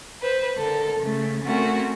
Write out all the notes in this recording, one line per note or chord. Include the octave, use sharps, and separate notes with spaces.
B4 C5
D3 A4 A#4
C#3 A3
A3 C4 C#4 F#4 A#4